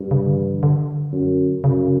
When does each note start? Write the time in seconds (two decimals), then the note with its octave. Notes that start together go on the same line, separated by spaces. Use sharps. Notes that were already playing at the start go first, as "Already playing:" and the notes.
Already playing: G2
0.11 C#3
0.24 D3
0.37 E3
0.49 D3
0.63 D3
1.13 F#2
1.63 F#2 C#3